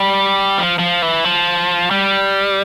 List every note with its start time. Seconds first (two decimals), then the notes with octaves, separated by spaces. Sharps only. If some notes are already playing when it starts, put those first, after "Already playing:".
Already playing: G3
0.58 F3
0.79 F3
1.02 E3
1.25 F3
1.91 G3